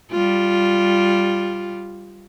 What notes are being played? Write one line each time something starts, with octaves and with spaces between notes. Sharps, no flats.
G3 F4